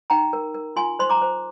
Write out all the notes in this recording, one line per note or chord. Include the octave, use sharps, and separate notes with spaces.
D#4 G5 A#5
A#4
A#4
F4 G#5 C6
C5 C6
A#5 D6
C5